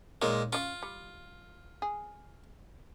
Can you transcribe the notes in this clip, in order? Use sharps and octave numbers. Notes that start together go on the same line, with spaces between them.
A#2 D#3 G#3 C#5
C#4 F4 D#5 F5
G3
G#4